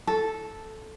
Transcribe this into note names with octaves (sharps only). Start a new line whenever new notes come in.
A4